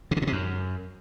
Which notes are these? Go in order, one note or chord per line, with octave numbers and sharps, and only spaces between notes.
C3
D3
A#2
C3
F#2